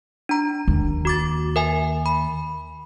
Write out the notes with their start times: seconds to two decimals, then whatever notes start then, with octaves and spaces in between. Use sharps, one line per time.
0.29 D4 A#5
0.68 D#2
1.05 F#4 D6 A6
1.56 A#4 E5 G#5
2.06 B5